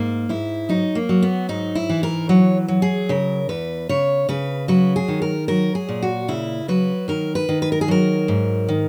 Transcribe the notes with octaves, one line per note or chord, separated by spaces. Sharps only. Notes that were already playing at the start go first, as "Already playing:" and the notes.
Already playing: G#2 A#3
G#2 E4
F#3 D#4
A#3
F#3
B3
G#2 D#4
E4
E3
A#4
F#3 C#5
F#3
G#4
C#3 A#4
E2 B4
C#3 C#5
C#3 B4
F#3 B4
G#4
D#3
A#4
F#3 A#4
G#4
A#2
F#4
C#3 E4
F#3 B4
D#3 A#4
B4
D#3
B4
A#4
G#4
F#3 A#4
G#2
D#3